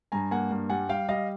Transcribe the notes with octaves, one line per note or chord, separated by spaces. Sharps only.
G2 G#5 A#5
A#3 F#5 G#5
G2
G3 F#5 G#5
G3 F5 G5
G3 D#5 F5